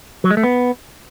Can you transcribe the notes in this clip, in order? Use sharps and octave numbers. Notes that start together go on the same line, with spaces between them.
F#3
G#3
A3
B3